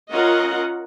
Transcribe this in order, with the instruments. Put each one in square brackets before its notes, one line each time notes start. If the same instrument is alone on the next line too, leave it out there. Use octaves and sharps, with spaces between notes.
[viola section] C#4 F4 A#4 D#5 F#5